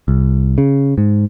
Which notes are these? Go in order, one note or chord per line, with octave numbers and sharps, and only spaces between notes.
C2
C#3
G#2